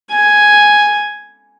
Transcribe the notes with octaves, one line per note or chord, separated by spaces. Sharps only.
G#5